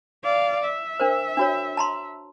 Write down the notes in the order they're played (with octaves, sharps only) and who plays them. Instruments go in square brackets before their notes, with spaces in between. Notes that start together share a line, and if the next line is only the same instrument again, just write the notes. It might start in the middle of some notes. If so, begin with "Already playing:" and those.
[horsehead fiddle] D5 F5
E5
[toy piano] D4 A#4 C5
D4 F#4 C#5
A5 A#5 C6